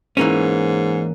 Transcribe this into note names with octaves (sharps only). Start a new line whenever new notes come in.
G#2 E3 A#3 C#4